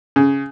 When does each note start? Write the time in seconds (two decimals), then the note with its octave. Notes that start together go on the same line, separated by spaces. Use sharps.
0.16 C#3